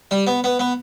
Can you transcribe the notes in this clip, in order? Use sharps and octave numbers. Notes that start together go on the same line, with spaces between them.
G3
B3
B3
B3